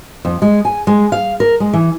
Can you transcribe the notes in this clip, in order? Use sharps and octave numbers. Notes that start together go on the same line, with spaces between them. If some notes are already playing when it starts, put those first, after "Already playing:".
F2
G#3
G#5
G#3
F5
A#4
G#3
E3